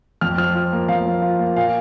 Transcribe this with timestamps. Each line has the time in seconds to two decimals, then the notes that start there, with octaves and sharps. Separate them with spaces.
0.21 F2 F6
0.38 F3 F6
0.55 F4
0.72 A#3
0.89 F2 F5
1.06 F3
1.22 F4
1.39 A#3
1.56 A#2 F5